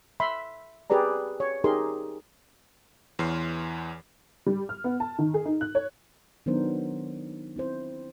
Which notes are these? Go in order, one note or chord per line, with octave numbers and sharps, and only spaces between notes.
E5 B5 C6
G4 G#4 B4 D5 A#5
C#5
D#4 G4 G#4 A#4 C6
E2 E3 C#5 C6 F6 C7
G3
F6
B3
A5
D#3
G#4
D#4
F#6
C#5
D#3 F#3 B3 D4 A#4 C5
C4 E4 C5